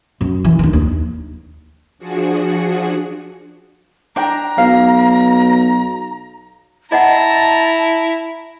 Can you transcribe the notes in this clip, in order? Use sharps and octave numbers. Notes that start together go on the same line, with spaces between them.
F#2
E3
D#3 D4
D#2
F3 D4 F#4 G#4 C#7
D4 G5 A#5
B1 F5
E4 D#5 F#5 A5 A#5